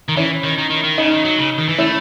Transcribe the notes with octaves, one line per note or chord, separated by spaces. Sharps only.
D#3
E3 C#4 E4
D#3
D#3
D#3
D#3
C#3 D#4
D#3
F#3
C#3
D#3
E3
A3 C#4 E4